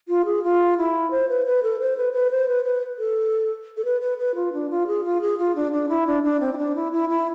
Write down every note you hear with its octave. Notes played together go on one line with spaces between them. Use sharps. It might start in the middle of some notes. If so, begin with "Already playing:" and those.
F4
G#4
F4
E4
C5
B4
B4
A4
C5
B4
B4
C5
B4
B4
A4
A4
B4
B4
B4
F4
D4
F4
G#4
F4
G#4
F4
D4
D4
E4
D4
D4
C4
E4
D4
E4
E4
E4